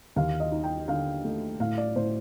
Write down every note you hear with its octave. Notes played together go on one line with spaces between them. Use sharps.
D#2 F5
D#5
D#4
G5
D3 F5
A3
A2 F5
D5
A2 C5